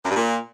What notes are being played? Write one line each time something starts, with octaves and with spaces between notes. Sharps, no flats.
F#2
G2
A#2